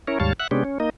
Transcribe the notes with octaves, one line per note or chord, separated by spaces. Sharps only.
C#4 E4 A#4 C#5
D#2 G#2 G3 C#5 F5 A5
E5 F#5 F#6
C3 G#3 B3 C#4 D4 G4
C#4
A#3 D#4 D#5